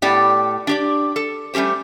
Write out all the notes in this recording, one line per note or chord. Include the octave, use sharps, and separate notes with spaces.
A2 B3 G4 D5
D4 G4 D5
A4
G3 A3 C#4 G4 C5